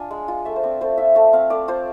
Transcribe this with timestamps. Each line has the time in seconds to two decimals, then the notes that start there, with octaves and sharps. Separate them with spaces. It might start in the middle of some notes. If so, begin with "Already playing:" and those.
Already playing: D4 F4 G#5
0.11 G#3
0.28 F4
0.45 A3 E5
0.56 C5
0.63 C4 D5
0.81 A3 C5
0.98 F4 E5
1.15 A3 A5
1.33 C4 F5
1.50 A3 D5
1.68 F4 C5